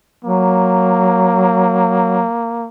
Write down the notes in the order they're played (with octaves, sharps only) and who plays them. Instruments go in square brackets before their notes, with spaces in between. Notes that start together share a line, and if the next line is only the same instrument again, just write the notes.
[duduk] F#3 [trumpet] A#3